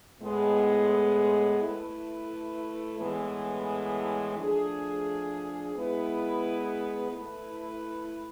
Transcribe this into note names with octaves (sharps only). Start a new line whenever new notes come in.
A2 G#3 B3
A3 E4 B4
A2 E3 G#3 B3
F3 A3 D4 G#4
G#3 B3 E4 B4
A3 E4 B4